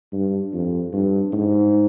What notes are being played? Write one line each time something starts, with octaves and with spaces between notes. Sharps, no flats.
G2
F2
G2
G#2